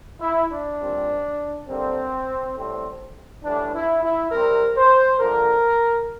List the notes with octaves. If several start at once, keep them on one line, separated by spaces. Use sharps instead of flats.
E4
D4
A#2 G3 C4
D3 G3 A#3 C4
A2 G3 C4
A2 E3 G3 D4
E4
E4
C3 G3 C4 A#4
C5
D3 F3 A#3 A#4